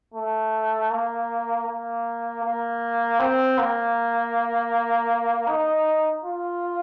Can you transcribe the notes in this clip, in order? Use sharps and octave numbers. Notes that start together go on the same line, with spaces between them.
A3
A#3
A#3
A#3
C4
A#3
D#4
F4